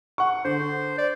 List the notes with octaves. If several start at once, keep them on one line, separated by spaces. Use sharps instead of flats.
F#5 C#6
D3 C5
D5